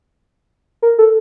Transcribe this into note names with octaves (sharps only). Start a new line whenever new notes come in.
A#4
A4